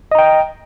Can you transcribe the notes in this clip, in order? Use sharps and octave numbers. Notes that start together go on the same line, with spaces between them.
D#5 G5 A#5